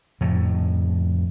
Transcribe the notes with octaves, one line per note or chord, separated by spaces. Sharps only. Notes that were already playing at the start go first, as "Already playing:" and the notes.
F2 A2 C#3